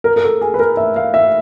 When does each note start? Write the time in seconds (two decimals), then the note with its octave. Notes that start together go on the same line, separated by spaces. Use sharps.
0.04 A#4
0.16 A#4
0.23 A4
0.41 G#4
0.54 B4
0.60 A#4
0.77 E5
0.96 F5
1.14 E5